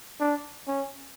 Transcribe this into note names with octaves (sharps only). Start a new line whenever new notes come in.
D4
C#4